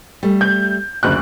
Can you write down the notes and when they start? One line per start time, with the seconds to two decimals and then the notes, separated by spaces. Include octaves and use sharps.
0.23 G3 A3
0.41 G6
1.03 F#1 D2 D5 F#6